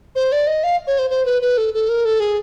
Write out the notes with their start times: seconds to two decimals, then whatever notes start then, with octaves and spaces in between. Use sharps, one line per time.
0.15 C5
0.32 D5
0.47 D#5
0.64 F5
0.87 C#5
0.99 C5
1.10 C5
1.26 B4
1.42 B4
1.57 A4
1.74 A4
1.89 A#4
2.05 A4
2.20 G#4